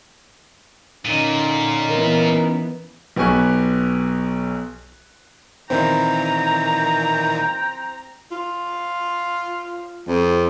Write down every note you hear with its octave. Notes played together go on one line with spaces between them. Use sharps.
A#2 D3 C#4 D#4
E3 B3 A#4
B1 B3 G4 G#5 C#6 F#6
A#2 D#3 E3 C4 G5 A#5
F4
F2